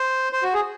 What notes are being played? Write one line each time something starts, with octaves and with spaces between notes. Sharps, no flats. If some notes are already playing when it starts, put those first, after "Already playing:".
Already playing: C5
C5
F#4
G#4